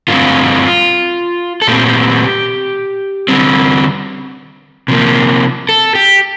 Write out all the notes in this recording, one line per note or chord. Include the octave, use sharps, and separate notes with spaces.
G2 D3 A3 C4 F4
A4
A#2 A3 C4 G4
D3 G3 C4
C3 F3 A#3
A4
G4